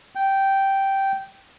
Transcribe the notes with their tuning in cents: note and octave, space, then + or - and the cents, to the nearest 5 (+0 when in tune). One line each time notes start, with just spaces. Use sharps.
G5 -10